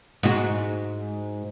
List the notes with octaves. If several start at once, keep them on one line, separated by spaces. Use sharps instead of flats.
G#2 F#4